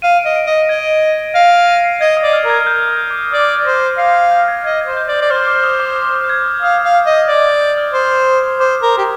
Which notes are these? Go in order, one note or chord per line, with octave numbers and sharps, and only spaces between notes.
F5 D#7
D7
D#5
D7
D#5
A#6
D#5 G#6
F5 A#6
D7
D#7
C7
D#5 G#6
D#6
D5
F6
A#4
G#6
F6
G6
D#6
D6
D5 D#6
C5 A#6
F5 C7
G6
G6
G6
G#6
D#5 G#6
G#6
C5
G6
D5
G6
D5
C5 F6
D6
D#6
D6
D#6
F6
G6
G#6
D#6
F5 D#6
D#6
F5
F6
D#5
G6
D5 F6
G6
G6
F6
C5 D#6
C5 D6
A#4
G4